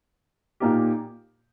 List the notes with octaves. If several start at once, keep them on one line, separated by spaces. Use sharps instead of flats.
A#2 A#3 D#4 G4